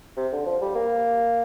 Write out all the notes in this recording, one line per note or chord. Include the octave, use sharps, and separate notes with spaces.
C3
D3
F3
G3
A#3